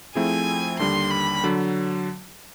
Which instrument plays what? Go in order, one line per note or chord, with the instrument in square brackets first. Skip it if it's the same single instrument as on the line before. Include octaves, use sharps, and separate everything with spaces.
[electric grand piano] F3 A3 C4 E4 G#4 [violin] G#5
[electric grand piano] D#2 D3 G3 [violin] C6
[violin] B5
[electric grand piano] D3 F#3